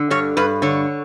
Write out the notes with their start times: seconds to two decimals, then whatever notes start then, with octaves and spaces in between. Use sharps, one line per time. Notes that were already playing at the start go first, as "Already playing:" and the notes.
Already playing: D3
0.11 G2 C#5
0.37 G2 B4
0.62 D3 C#5